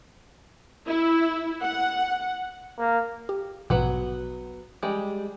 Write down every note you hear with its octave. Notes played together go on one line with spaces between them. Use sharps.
E4
F#5
A#3
G4
A#1 G#2 B2 F#3 B3 F#4
G3 G#3